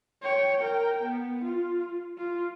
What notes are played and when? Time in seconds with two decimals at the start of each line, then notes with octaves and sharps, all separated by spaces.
0.22 C#5 G5
0.57 A#4 G5
1.02 B3
1.44 F4
2.17 F4